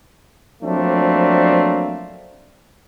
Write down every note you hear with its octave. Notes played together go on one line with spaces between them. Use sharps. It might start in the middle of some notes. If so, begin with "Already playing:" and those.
F3 F#3 A3 A#3 C4 D4